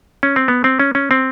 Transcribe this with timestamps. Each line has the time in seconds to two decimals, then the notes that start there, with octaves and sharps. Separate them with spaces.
0.23 C#4
0.36 C4
0.48 B3
0.64 C4
0.79 C#4
0.95 C#4
1.11 C4